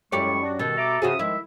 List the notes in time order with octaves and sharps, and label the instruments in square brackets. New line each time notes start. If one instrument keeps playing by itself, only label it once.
[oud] F#2 G4 D5 [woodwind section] A2 G#3 E4 [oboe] C#6
[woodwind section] D4 F#4
[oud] B2 [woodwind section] D#3 [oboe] A4
[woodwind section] E5 A#5 D6
[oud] C#3 F#4 G#4 [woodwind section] F3 E5 D#6
[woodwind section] D#3 F3 G#3 [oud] E4 [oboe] E5